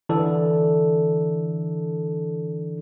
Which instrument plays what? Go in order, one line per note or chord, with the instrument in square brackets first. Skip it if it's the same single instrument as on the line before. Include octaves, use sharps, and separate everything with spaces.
[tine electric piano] D3 E3 D4 A4